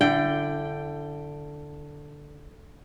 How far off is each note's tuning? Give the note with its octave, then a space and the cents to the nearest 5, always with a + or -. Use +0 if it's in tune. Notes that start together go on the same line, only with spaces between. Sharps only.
D3 +0 E4 +35 G5 +0